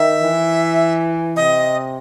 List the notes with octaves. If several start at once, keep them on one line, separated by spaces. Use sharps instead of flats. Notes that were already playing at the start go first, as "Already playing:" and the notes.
Already playing: D#3 E5
E3
C3 D#5